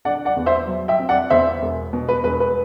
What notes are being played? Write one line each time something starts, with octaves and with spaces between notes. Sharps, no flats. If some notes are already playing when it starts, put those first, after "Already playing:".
D3 D5 F#5
D5 F#5
E2
C5 E5
F#3
E5 G5
C4
D5 F#5
E2 C5 E5
E1
B2
B4
E1 B4
B4